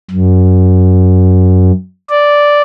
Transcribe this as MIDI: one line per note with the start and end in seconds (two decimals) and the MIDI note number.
0.11 1.72 42
2.09 2.62 74